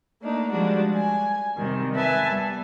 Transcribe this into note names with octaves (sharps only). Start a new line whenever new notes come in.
A3 A#3 D4 D#4
F3 G3 G#3 D4 F#4
G#5
C3 D#3 G3
B4 E5 G#5 A5
G3 B3